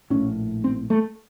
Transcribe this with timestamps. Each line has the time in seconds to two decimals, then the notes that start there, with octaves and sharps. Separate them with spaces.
0.10 A#1 A2 C#4
0.64 C4
0.90 A3